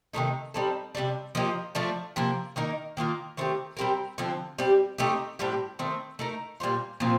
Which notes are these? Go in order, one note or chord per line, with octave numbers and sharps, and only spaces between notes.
C3 D#3 A3 D#4
G3 C4 D#4 A4
C3 G3 D4
F3 A#3 D#4 G4
F3 A3 D4
C3 F3 A#3
D#3 A#3 D#4 A#4
D#3 A#3 F4 A#4
D#3 A3 C4 G4
G3 C4 G4 A#4
D3 F3 C4
G3 C4 G4
A3 C4 D#4 G4
A2 G3 C4 G4
D#3 A3 C4
A3 D#4 A#4
A#2 G3 C4 F4
A#2 F3 C4 F4